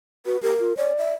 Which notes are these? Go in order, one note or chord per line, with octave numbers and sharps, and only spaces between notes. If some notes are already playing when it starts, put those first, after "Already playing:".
F#4 B4
G4 A#4
F4
C#5 D5
E5